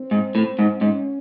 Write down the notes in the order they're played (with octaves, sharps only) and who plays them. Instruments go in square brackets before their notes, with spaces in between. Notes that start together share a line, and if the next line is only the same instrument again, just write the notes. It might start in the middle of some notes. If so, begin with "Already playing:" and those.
Already playing: [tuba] C4
[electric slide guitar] G#2
A2
G#2
[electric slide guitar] G#2 [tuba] C#4